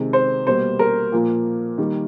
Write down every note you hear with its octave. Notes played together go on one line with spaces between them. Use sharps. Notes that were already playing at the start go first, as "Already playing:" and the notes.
Already playing: C3 D#3 G#3
C5
B2 G3 A#3 C5
A#4
A#2 F3 A#3
D#3 G3 A#3